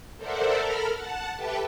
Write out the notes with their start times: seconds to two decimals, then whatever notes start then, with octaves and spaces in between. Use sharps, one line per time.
0.17 A4 A#4 C5 D5 E5 F#5
0.56 A4 A#4 B5 F6
0.92 F#5 A5
1.36 G4 A4 B4 E5 G5 A5